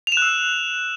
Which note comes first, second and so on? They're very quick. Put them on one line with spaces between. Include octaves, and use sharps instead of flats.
F7 E7 F#6 E6